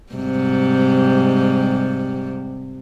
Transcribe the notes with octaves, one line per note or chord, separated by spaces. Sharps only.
G#2 C3 G3